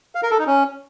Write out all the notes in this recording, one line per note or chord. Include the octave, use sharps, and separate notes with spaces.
F5
A#4
A4
D#4
C#4